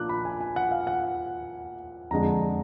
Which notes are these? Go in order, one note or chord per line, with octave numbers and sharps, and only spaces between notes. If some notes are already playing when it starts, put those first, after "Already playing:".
Already playing: A#2 F3 A#3 D4 D6 F#6
B5
G#5
G#5
F#5
F5
F#5
F2 D3 G#3 D4 A#5